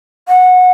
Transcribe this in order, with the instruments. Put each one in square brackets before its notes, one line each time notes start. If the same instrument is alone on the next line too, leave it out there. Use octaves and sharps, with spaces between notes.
[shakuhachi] F#5